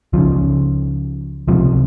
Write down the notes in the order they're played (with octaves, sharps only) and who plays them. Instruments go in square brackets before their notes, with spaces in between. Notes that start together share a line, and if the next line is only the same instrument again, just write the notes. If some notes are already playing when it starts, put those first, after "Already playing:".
[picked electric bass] C#2 C#3 F3
C#2 C3 F3